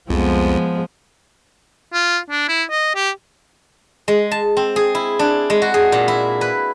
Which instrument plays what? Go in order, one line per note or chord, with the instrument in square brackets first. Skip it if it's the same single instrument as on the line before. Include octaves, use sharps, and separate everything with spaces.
[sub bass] C2 [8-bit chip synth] F2 [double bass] F3 [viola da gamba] G#3 B3
[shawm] F4
D4
E4
D#5
G4
[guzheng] G#3
A5
C4
G#4
E4
D4
G#3
F#4
G#4
A#2
E4
B4